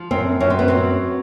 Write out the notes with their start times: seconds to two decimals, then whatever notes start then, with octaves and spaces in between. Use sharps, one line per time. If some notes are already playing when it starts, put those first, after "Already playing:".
Already playing: F3
0.11 F#2 C4
0.40 F#2 C#4
0.50 C4
0.59 B3
0.68 F#3 C4